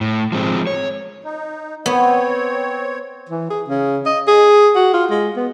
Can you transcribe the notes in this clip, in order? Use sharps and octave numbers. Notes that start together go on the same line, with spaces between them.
A2
F3 G#3 C4
C#5
D#4
B3 C4 C#5
E3
G#4
C#3
D#5
G#4
F#4
F4
G#3
B3